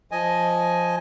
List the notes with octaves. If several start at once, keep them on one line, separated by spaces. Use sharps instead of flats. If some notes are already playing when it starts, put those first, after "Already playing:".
F3 D#5 G#5